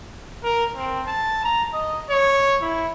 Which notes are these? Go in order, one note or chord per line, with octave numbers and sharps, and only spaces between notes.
A#4
C4
A5
A#5
D#5
C#5
E4